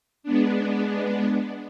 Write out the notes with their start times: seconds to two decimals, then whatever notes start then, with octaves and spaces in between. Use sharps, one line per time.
0.23 G#3 B3 D4